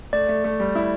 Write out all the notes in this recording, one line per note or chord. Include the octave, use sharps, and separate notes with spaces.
A3 D5
A3
A3
G3
E4